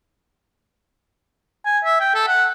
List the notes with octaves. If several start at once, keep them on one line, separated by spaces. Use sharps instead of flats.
G#5
E5
G5
A4
F#5